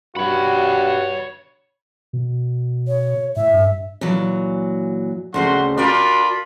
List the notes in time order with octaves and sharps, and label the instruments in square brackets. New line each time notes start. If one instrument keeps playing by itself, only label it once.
[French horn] G2 [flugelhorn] F#4 [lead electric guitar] C#5 B5
[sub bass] B2
[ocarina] C#5
[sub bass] A2 [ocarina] E5
[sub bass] G2
[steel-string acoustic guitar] A#2 E3 F#3
[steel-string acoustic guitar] D2 C#3 C4 [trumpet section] F#4 C6
[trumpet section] D4 F4 B5 [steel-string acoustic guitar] F#4 A#4 G5